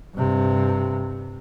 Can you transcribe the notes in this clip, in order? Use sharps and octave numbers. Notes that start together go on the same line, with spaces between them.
G2 C3